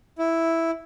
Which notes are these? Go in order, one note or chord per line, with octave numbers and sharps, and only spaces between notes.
E4